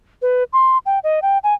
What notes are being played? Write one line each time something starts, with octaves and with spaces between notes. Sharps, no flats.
B4
C6
G5
D#5
G5
G#5